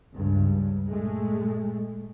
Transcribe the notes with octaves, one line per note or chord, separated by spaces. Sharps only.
C#2 G2 C#3
A#2 G#3 A3